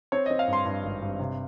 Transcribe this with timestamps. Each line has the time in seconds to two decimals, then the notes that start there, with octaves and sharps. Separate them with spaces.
0.12 C4 C#5
0.26 C4 D#5
0.39 F5
0.48 G2 C6
0.65 G2
0.84 G#1
1.02 G2
1.20 C3